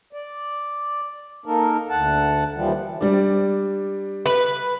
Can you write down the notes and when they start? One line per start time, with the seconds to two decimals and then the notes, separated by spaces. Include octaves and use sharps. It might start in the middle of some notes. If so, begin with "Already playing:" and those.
0.13 D5
1.46 A#3 D#4 A4 A#4
1.90 D2 F#5 A5
2.54 D#2 E3 F3 G3
3.01 G3 D4
4.26 B4